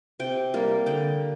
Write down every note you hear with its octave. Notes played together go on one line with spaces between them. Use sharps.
C3 G5
G3 A#3
D3 G5